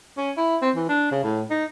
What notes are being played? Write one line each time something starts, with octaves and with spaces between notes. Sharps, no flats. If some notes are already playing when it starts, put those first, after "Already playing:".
C#4
E4
C4
E3
D4
C#3
A2
D#4